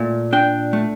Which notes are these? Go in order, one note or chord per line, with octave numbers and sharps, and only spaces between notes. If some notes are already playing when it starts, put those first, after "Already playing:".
Already playing: A#2 A3
D4 G5
A3